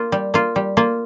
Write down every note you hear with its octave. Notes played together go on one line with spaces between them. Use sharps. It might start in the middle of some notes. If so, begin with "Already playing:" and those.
Already playing: A#3 F4
G3
A#3 F4
G3
A#3 F4